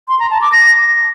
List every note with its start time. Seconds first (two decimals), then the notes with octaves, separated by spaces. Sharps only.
0.08 C6
0.19 A#5
0.30 A5
0.41 D6
0.52 A#6